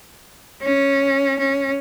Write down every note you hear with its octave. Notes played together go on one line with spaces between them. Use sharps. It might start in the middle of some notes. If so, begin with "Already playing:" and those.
C#4
C#4